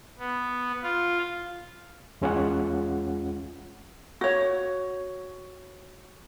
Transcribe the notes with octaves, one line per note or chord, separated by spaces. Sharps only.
B3
F4
E2 G#3 C#4 F4 G#4 F#5
F#4 C#5